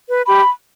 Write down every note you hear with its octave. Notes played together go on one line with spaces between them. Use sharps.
B4
G4 B5